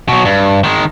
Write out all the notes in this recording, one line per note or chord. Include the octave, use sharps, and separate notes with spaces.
B2 F#3
G2
D#3 G#3